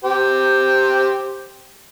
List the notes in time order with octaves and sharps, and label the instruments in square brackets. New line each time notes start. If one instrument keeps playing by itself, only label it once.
[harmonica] G4 C5